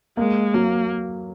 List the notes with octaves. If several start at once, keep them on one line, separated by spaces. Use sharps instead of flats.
G#3 A#3
F#3 A#3